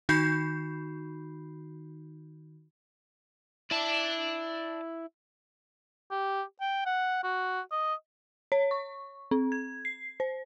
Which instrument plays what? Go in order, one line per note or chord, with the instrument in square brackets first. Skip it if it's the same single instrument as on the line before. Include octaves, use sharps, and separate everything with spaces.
[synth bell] D#3 D#4 F#4 B5 G6 C7
[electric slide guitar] E4 [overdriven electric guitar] D5 A5
[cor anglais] G4
G5
F#5
F#4
D#5
[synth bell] C#5
C#6
C4
G#6
C7
C5